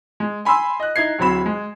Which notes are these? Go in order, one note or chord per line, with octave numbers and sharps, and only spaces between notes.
G#3
G#5 B5 C6 E6
D#5 F#6
D#4 E4 G#6 C7
D1 F#3 C4 B5 E7
G#3